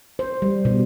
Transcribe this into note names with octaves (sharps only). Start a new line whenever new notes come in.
C5
G3
B2